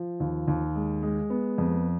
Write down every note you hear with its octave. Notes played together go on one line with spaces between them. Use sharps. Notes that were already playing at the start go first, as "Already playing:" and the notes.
Already playing: F3
D#2
D#2
G#3
G#3
B3
F2